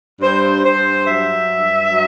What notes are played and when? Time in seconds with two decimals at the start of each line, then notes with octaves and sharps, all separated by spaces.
0.21 G2 C5
0.64 G2 C5
1.06 F#3 E5
1.48 G2
1.91 F#3